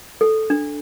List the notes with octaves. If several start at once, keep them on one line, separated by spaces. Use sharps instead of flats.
A4
D4